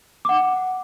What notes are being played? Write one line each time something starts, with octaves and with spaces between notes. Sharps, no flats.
F#5 D6